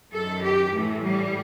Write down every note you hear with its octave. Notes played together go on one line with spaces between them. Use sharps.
F#2 D#3 A4
G4
A2 E3 A3
G3